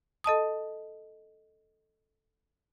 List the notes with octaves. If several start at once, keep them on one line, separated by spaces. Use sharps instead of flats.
A4 D#5 A5 D#6